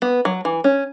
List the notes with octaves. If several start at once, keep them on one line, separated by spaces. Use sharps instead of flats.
B3
F#3
E3
C#4